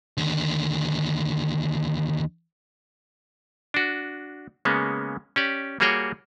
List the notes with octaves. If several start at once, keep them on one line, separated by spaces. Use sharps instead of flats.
D#2 D3
D4 F#4
C#3 G#3 A#3 B3 C#4
C#4 G4 D5
G3 A#3 F#4 G#4 C#5 G5